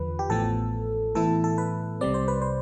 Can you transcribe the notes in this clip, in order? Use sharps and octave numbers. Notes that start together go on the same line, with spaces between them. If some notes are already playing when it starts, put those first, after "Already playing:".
Already playing: E2 D3 F3 B4
G4
A1 A2 F3 B3 A4
A2 E3 B3 E4 A4
A4
B4
C2 C3 G3 C4 D5
C5
B4
C5